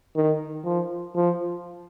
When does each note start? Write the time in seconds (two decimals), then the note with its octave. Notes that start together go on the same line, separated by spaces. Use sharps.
0.16 D#3
0.65 F3
1.15 F3